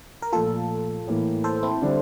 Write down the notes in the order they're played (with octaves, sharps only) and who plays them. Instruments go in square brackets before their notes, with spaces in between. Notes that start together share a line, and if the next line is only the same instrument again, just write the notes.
[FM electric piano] A#4
[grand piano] A#2 F3 A3 [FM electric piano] F4 A4
[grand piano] A2 E3 A#3
[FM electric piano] A4 C5
C4 E4
[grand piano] D3 G3 D4